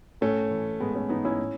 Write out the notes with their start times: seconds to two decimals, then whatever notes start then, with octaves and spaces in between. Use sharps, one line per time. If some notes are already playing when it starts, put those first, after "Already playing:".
0.21 A2 A3 C#4
0.51 E3
0.80 A2 G#3 B3
0.95 A3 C#4
1.09 E3 B3 D#4
1.25 C#4 E4
1.39 A2